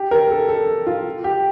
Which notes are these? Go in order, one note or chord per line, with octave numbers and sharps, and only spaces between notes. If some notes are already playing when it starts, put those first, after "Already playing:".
Already playing: G4
A#4
A4
A4
F4
G4